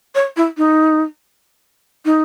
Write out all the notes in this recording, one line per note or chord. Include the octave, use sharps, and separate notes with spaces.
C#5
E4
D#4
D#4